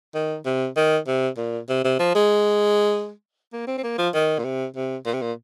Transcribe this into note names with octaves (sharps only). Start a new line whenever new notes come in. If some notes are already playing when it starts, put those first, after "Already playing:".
D#3
C3
D#3
C3
A#2
C3
C3
F3
G#3
A#3
C4
C4
A#3
F3
D#3
A#2
C3
C3
A#2
C3
A#2